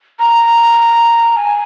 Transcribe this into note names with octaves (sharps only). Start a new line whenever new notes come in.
A#5
G#5